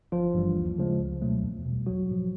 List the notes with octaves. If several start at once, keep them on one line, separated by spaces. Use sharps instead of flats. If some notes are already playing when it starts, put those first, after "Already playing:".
G1 F3 F4
G2 E3 G3
D#2
C#3 F3 G#3
C#2
B2 F#3 A3
E2
B2 G3
A#1 F#3 F#4
G#2 F3